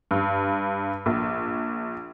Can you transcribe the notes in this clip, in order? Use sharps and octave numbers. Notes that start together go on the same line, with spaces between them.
G2
A#1